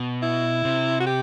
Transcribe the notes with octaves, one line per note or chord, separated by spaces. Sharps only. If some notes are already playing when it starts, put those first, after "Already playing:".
Already playing: B2
E4
C3
F#4
G4